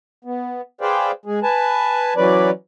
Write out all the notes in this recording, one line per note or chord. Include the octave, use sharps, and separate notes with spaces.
B3
G#4 B4 C5 D5 F5 G5
G#3 G#4
B4 G#5 A5
E3 F#3 C#4 B4 D5